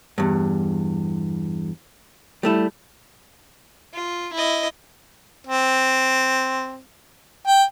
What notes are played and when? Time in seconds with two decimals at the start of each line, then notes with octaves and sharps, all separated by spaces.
0.18 E2 G2
2.43 G3 A3 E4
3.94 F4
4.33 E4 D#5
5.47 C4
7.47 G5